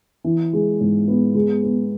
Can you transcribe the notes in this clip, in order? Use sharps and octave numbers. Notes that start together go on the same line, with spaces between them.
E3
G#3
G#2
B3
G#3
B3